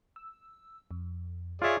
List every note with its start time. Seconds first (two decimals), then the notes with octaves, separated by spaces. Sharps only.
0.16 E6
0.91 F2
1.62 F4 G#4 C#5 D5 E5